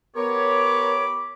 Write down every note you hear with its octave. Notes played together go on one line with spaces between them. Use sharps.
B3 G4 A#4 C#5 B5 D6